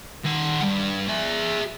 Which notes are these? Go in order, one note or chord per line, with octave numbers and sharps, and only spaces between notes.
D#3 F#5
G2
G#4 E5